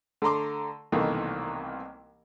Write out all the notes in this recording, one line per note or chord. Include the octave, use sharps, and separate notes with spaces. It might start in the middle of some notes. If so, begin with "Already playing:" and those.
D3 A3 A#5 C6 D6
C2 B2 D#3 E3 A3 A#3